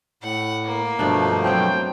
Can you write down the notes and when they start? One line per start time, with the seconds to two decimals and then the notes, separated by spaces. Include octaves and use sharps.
0.23 A2 F#5
0.65 A#3
0.99 G2 B2 F3 A3 D4
1.44 F#3 C4 F#5 G5